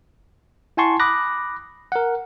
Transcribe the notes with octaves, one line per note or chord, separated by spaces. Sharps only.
E4 F#5 G#5 A5 C6 C#6
B5 D6 D#6 F#6 A#6
A#4 F#5